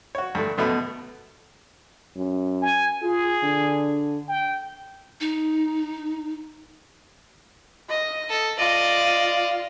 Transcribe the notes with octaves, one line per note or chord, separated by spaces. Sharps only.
F#4 C#5
G2 D3 A3
F#2 B2 A3 B3
F#2
G#5
F4 G#4
D3
G5
D#4
D#5
A4
F4 D5 D#5